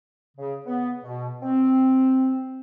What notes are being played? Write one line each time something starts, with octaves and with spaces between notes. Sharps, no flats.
C#3
B3
B2
C4